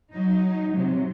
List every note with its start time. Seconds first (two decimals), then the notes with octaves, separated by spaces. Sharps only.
0.11 F#3 D#4
0.72 C3 F#3